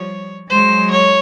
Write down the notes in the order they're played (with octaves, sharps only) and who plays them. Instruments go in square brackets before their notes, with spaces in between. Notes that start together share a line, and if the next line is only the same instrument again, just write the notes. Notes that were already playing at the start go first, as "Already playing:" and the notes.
Already playing: [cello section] F3 G3 [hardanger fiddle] C#5
[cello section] F#3 G#3 [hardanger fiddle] C5
[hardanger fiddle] C#5